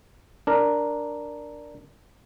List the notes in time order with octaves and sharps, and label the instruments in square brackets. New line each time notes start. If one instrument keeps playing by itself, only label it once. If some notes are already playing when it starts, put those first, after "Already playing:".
[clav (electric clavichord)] D4 A#4